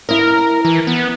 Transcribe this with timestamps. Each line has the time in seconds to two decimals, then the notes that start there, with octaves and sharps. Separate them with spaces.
0.09 E4 A#4 D#5
0.65 E3
0.87 B3